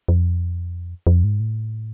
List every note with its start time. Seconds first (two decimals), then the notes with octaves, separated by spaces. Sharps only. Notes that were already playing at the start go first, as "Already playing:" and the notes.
0.08 F2
1.07 F2
1.24 G#2
1.40 A2